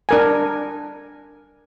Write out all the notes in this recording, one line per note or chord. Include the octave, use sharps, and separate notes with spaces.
D4 A#4 G#5